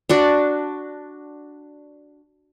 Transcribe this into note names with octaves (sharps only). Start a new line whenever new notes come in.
D4 F#4 D5